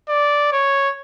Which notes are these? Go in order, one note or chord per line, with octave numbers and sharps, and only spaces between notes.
D5
C#5